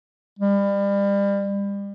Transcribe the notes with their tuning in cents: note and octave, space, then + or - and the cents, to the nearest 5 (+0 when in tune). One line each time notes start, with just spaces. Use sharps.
G3 +30